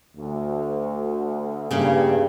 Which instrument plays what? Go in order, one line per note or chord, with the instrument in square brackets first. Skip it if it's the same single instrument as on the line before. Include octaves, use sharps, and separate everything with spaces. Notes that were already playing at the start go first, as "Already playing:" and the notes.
[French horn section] D2
[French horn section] E2 G2 [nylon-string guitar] C#3 A#3 [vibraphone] G#4 F5